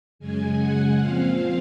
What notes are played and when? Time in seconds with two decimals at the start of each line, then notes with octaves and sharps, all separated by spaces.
0.19 F#2 C#3 G#3 G#5
0.57 F#5
0.97 A#2 F3 C4 F5